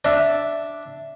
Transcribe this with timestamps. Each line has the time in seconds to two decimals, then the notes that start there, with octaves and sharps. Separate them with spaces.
0.05 D4 E5